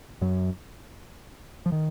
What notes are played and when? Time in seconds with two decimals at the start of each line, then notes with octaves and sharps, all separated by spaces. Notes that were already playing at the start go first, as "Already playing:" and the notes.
0.21 F#2 F#3
1.66 F3
1.72 D#3